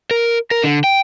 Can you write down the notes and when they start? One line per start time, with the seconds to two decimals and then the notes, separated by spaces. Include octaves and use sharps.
0.11 A#4
0.51 A#4
0.63 D3
0.84 G5